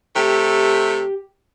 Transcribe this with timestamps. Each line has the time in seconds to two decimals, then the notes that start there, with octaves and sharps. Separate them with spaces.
0.16 C3 A3 G4